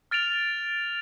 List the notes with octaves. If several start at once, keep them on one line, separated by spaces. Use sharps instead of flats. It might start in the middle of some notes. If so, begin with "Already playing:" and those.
F6 A6 D7 F7